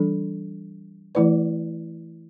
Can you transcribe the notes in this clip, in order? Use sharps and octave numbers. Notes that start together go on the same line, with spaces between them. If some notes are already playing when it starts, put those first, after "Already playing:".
Already playing: E3 G3 D4 A4
E3 A3 E4 B4 D5